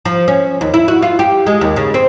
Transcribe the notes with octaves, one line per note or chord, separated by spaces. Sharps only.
F3
C#4
D#2
E4
F#4
F4
G4
G#3
D#2
C#3
C4